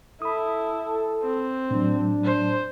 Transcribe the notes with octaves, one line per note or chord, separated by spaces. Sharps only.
E4 A4 B5 D#6
C4
A2 F#3 D4
C5